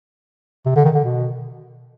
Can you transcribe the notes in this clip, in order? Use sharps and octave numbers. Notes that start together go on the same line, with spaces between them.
C3
D3
D#3
D3
B2